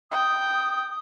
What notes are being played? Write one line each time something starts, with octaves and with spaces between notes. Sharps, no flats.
G5 D#6